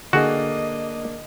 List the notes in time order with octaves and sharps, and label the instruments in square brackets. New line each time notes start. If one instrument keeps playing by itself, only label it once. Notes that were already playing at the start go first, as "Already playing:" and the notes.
[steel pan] D3 G#4 [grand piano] A#3 D4 [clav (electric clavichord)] F#4 [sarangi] D#5